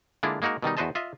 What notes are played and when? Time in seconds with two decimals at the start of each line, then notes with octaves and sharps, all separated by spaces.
0.23 D3 G#3 A#3 D4 E4 F4
0.42 G#3 A#3 D#4 F#4 A#4
0.62 B2 D#3 G3 D#4
0.77 E2 F#4 B4 C5 D#5 A5
0.95 F4 D#5 E5